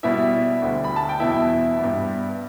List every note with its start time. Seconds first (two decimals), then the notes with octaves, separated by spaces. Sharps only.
0.03 B2 G3 B3 E4 E5
0.62 D2 D3 G3
0.84 B5
0.96 A5
1.09 G5
1.20 E2 B2 B3 E4 E5
1.79 G2 G3 B3